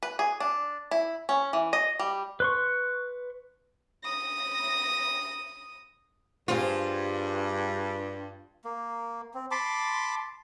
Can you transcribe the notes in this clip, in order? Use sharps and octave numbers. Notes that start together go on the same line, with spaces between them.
B4
G#4
D4
E4
C#4
E3
D#5
G3
B4 C6 C#6
D#6 A#6
G2 F4 G#4 C5
A#3
C4
A5 B5 C6 D6